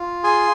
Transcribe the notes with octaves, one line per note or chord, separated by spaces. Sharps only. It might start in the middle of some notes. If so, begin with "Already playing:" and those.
Already playing: F4
G#4 G#5 C6